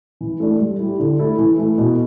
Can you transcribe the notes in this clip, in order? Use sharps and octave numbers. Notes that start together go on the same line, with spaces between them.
E3
A3 D4
G3
E4 G4
D3
A3 E4 A4
E3
A3 E4
B2